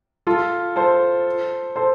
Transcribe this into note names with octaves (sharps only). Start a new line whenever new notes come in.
F4 A4
A4 C5
A4 C5